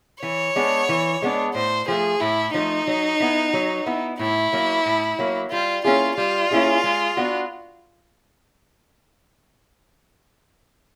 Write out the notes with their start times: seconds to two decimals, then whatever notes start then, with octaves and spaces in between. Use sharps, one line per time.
0.22 E3 C#5
0.56 G#3 B3 D4
0.89 E3
1.22 G#3 B3 D4
1.54 A2 C5
1.88 F3 A3 G#4
2.21 A2 E4
2.54 F3 A3 D#4
2.87 F#3
3.20 B3 E4
3.53 F#3
3.86 B3 E4
4.19 A2 E4
4.53 F#3 A#3
4.86 A2
5.19 F#3 A#3
5.51 G3 F4
5.84 A#3 C#4 E4 F4 G#4
6.17 G3 F4
6.51 A#3 C#4 E4 G#4
6.84 G#3
7.17 B3 D4 F#4